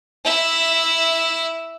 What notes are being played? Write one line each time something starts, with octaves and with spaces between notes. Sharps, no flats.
E4 E5